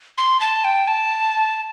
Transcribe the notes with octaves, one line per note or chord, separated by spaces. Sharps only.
C6
A5
G5
A5